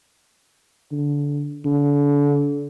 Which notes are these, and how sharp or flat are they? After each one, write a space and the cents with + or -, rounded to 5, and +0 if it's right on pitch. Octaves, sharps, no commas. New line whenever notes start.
D3 -20
D3 -35